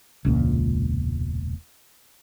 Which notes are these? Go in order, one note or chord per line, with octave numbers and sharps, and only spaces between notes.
E1 C#2 A#2